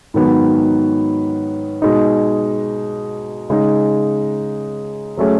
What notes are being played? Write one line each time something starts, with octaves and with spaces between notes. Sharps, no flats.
G#2 D#3 F#3 B3
B2 G#3 D#4
C#3 G#3 D#4
F#3 A3 C#4 G#4